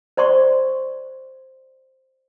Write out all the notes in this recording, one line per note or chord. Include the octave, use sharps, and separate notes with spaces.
C5 D5 C6 C#6